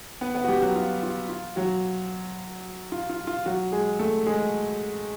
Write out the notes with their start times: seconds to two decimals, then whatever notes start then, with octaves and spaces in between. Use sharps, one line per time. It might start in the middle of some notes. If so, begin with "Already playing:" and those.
0.21 B3 B4
0.35 B3 B4
0.44 F#4
0.48 G3 G4
0.62 F#3 F#4
0.76 F4
1.03 F4
1.29 F4
1.56 F#3 F#4
2.92 F4
3.10 F4
3.27 F4
3.46 F#3 F#4
3.72 G#3 G#4
3.99 A3 A4
4.27 G#3 G#4